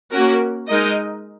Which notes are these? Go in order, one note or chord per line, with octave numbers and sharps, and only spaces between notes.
A#3 C#4 F#4 A#4
G#3 D#4 A#4 D#5